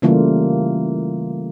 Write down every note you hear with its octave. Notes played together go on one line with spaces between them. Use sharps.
C#3 E3 G3 A3 A#3 F4